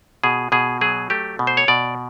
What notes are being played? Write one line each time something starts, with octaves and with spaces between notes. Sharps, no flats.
B2 G#4
B2 G#4
F#3 G#4
A3 G4
B2
C5
C#5
B2 D5